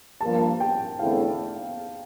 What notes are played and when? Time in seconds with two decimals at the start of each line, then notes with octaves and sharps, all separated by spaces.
0.21 G2 F3 A#3 D4 A5
0.60 G5
0.99 E2 D3 A3 C4 E4 F5